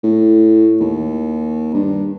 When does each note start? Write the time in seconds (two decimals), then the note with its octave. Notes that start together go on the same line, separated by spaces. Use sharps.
0.03 A2
0.80 D#2
1.74 G2